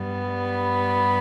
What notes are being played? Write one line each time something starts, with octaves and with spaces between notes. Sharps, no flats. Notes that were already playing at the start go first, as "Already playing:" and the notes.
Already playing: G2 G3 B3
B5